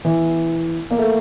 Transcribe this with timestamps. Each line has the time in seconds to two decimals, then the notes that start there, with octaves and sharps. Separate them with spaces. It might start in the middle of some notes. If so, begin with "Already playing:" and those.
0.05 E3
0.91 A#3
0.98 A3